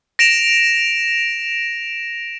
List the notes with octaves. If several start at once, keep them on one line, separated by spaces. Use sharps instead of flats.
A#6 D7 E7 F7